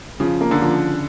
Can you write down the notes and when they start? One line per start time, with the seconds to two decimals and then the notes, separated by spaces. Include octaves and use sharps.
0.20 C#3 F3
0.41 A#3
0.51 D3
0.61 F3